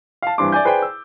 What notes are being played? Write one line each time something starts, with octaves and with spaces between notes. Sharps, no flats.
F5 A5
G2 E3 C4 D4 C6 D6
D5 E5 G#5 G6
G#4 B4 C5 D5 G5 G#5
E6